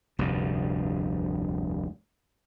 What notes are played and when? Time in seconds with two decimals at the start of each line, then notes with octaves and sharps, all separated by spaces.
0.19 F1 D2 G2